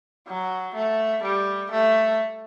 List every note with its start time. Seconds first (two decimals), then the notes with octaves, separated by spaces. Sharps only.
0.28 F#3
0.75 A3
1.23 G3
1.71 A3